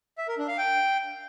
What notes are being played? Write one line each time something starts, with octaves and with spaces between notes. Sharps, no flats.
E5
A#4
D4
F5
G5